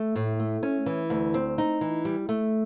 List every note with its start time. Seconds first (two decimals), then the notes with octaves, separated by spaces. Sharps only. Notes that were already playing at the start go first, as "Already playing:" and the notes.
Already playing: A3
0.16 A2
0.40 A3
0.63 C#4
0.86 E3
1.10 D2
1.34 C4
1.58 D#4
1.81 E3
2.05 G3
2.29 A3